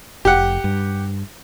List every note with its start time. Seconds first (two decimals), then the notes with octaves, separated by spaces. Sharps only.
0.25 F1 G4 F#5
0.64 G2